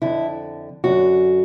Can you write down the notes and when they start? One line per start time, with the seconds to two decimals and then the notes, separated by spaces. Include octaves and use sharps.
0.02 F2 D3 E4
0.84 F#2 D3 F#4